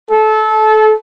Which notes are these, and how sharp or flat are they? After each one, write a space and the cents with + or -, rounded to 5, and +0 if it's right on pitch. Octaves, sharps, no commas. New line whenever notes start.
A4 -25